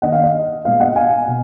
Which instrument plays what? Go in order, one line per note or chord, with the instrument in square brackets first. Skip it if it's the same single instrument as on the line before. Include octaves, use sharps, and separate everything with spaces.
[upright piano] D#3 A#3 D#5 F#5
F5
D#5
A#2 G#3 B3 F5
D#5 F#5
F5 G#5
B2